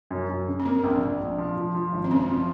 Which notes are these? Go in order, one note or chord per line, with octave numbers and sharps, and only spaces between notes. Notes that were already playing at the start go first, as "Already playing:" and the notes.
F#2
F#2
C#3
C#4
A#3 C4
A#1
A#1
A#1
F3
F3
F3
G#1
C4
F#1 C#4
F3